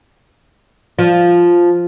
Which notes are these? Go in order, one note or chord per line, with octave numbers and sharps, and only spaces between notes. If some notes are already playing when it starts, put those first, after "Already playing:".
F3